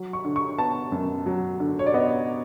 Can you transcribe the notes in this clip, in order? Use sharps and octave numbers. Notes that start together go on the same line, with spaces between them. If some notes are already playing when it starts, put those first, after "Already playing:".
Already playing: F#3
C#6
D3
C#6
B3 A5
F#2
F#3
D3
C#5
D5
B3 D#5